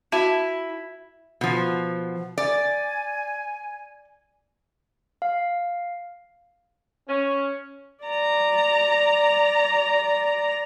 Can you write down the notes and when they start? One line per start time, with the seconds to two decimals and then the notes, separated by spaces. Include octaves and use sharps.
0.12 E4 F#4 A5
1.41 B2 F3
2.38 D5 G#5
5.22 F5
7.08 C#4
8.04 D5 A#5